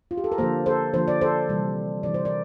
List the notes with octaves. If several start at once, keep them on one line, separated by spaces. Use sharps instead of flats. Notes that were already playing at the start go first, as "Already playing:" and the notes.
F4
G4
A4
A#4
D3 F3 A#3 A4 C5
A4 C5
D3 F3 A#3 C5
D5
A4 C5
C3 E3 G3
C3 E3 G3 D5
C5
A#4 D5